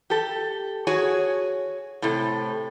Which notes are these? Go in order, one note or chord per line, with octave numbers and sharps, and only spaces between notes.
G4 A4
F#4 G#4 C#5 G#5
A2 C3 A4